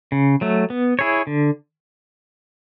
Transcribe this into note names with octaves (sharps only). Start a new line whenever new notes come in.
C#3
F#3 A3
B3
E4 G#4 C#5
D3